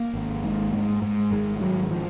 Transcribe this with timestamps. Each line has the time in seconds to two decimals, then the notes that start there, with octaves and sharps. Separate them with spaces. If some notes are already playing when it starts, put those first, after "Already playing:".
Already playing: A#3
0.14 G#1
0.44 G#2
0.73 G#2
1.02 G#2
1.31 G#1 G#3
1.61 G#1 F#3
1.91 F3